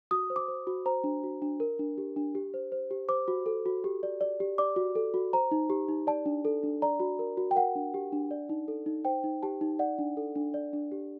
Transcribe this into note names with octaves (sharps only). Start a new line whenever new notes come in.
F#4 D#6
C5
D6
C5
F#4
C5 A#5
D4
F#4
D4
A#4
D4
G4
D4
G4
C5
C5
G4
C5 D6
F#4
A4
F#4
G4
D5
D5
G4
D5 D6
F#4
A4
F#4
C5 A#5
D#4
G4
D#4
D5 A5
D4
A4
D4
D5 A#5
F#4
A#4
F#4
G5
A#4 F#5
D4
G4
D4
D5
D#4
A4
D#4
C5 G5
D#4
G4 A5
D#4
D5 F#5
D4
A4
D4
D5
D4
G4